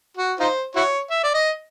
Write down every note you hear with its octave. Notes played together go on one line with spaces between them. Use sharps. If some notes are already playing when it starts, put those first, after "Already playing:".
F#4
D#4 F4 C5
E4 F#4 C#5
E5
D5
D#5